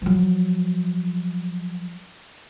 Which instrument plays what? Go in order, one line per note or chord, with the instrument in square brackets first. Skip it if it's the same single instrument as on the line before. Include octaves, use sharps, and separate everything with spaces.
[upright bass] F3 F#3